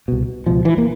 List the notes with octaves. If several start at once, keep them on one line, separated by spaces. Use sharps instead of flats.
C2 B2
C#2 B2 F3
E3
A#3